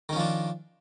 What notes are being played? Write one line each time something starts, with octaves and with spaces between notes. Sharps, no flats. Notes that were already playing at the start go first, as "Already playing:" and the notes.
D#3 F3 C#4 D4